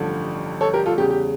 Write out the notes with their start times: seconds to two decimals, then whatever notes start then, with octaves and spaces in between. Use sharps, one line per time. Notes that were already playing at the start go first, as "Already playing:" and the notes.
Already playing: A1 G2 D3 F3 A3
0.61 A4 C#5
0.74 G4 A#4
0.86 F4 A4
0.98 E2 C#3 G3 G4
1.10 G4